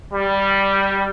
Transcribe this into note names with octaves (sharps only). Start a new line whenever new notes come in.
G3